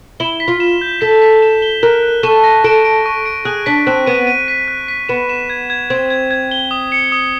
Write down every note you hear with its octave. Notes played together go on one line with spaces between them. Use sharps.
E4 G7
B6
F4
E7
G6
A4 B6
B6
E7
G7
A#4 F#6
F#6
A4 C#6
A#6
A4 D7
D7
C#6
D7
G#4 F#6
D4 B6
C4 F#6
B3 D#7
D#7
B6
F#6
B6
B3 E7
E7
G#6
G#6
C4 G#6
G#6
G#6
G7
D#6
C#7
D#6